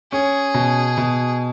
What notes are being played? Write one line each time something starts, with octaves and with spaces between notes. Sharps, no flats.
C#4 G#4
B2
B2